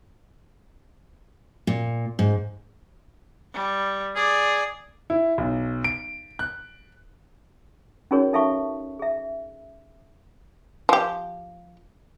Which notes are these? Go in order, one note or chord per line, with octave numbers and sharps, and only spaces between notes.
A#2
G#2
G3
G#4 D5
E4
B1
D7
F#6
C#4 D#4 F#4 G#4 A#4 C#5
D#4 A4 E5 F5 A5 C#6
G#4 E5
F3 G4